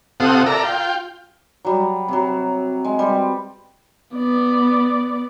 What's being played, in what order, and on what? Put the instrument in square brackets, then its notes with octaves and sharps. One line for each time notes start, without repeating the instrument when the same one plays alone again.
[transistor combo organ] C3 C4 F4 A4 F#5 D#6
A4 A#4 D5 E5 A#5
F4 G5
[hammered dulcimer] F#3 G3
C3 F#3
G#3
G3 C4 B4
[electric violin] B3 D5